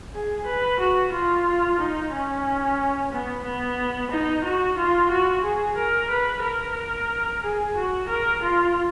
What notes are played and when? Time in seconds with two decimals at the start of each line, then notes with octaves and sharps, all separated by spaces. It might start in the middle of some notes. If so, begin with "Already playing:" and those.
0.13 G#4
0.45 B4
0.79 F#4
1.12 F4
1.79 D#4
2.12 C#4
3.12 B3
3.44 B3
4.11 D#4
4.44 F#4
4.77 F4
5.10 F#4
5.43 G#4
5.77 A#4
6.10 B4
6.43 A#4
7.43 G#4
7.76 F#4
8.09 A#4
8.43 F4